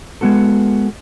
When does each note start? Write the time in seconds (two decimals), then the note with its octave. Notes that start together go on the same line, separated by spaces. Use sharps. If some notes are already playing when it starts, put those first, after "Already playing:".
0.21 G#3 B3 F#4 A4